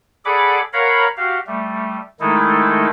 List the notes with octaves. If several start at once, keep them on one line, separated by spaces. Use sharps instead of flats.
G#4 A4 D5 F#5 B5 D6
A#4 C#5 F5 F#5 A#5 B5
F#4 G4 F5
G3 A3
D#3 G#3 A3 D#4 E4 A4